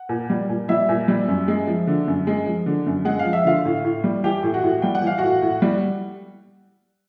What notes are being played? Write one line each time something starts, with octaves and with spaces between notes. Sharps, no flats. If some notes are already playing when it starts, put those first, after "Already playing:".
Already playing: F#5
A#2
G3
A#2
G3 E4 E5
A#2
G3
F#2
G#3
F3
D3
F#2
G#3
F3
D3
F#2
G#3 F#5
F5
F3
E5
D3 F4 F5
A2
A2
G3
E3 G4 G5
A2
F#4 F#5
A2
G3 G5
F#5
E3 F5
A2 F#4 F#5
A2
G3